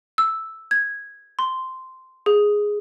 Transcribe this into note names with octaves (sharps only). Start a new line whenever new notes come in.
E6
G#6
C6
G#4